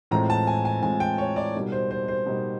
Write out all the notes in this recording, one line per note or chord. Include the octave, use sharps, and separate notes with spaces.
A2 E3 G#3 C4 F4 A#5
A5
G#5
G#5
A2 E3 G#3 C4 F4 G#5
G5
C#5
D5
B2 G3 A#3 D#4
C5
C5
C5
B2 G3 A#3 D#4